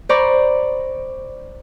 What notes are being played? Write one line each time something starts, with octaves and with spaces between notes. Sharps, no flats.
C5 D5 A#5 B5 C#6